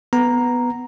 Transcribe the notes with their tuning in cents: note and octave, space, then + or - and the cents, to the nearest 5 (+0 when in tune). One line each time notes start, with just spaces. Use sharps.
B3 +0 A#5 +0